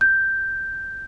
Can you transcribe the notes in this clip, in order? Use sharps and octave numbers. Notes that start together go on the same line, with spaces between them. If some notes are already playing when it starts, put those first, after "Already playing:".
G6